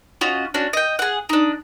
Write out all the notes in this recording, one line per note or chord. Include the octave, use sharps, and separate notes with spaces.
C#4 F4 F#4 D#5
C#4 D4 F#4
D#5 G5
G#4 F#5
D4 D#4